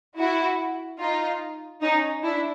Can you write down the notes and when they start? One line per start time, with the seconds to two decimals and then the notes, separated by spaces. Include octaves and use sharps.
0.19 E4 F#4
1.00 D#4 F4
1.82 C#4 D#4
2.23 D4 E4